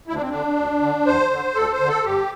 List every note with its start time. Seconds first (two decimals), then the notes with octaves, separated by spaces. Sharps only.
0.08 D2 E4
0.15 D4
0.22 C4
0.30 D3 D4
0.57 D2
0.81 D3
1.06 E2 C5
1.31 D3
1.55 D2 A4
1.71 C5
1.79 D3
1.88 A4
2.05 G2 G4